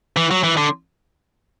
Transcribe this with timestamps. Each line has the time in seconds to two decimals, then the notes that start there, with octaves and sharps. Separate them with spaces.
0.17 E3
0.31 F#3
0.44 E3
0.57 D3